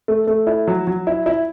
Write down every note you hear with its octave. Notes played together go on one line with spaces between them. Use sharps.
A3
A3
E4
F#3
F#3
E4
E4